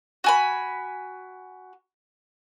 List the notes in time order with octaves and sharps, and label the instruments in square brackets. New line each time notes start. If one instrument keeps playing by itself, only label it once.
[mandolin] F#4 G#5 B5